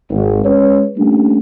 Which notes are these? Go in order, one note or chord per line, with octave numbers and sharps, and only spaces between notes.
G#1
G#3 C#4 B4 C#5
G3 A3 A#3 C#4 D4